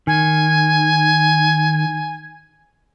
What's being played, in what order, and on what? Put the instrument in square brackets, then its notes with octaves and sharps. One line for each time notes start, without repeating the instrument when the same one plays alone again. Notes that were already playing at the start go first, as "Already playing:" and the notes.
[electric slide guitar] D#3 [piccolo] G#5